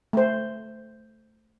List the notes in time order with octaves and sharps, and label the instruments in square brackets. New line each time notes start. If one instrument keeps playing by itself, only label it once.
[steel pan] A3 C5